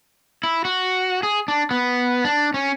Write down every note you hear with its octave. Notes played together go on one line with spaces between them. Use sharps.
E4
F#4
G#4
D4
B3
D4
C#4